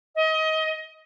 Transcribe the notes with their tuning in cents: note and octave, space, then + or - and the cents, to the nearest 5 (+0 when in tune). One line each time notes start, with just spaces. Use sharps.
D#5 +25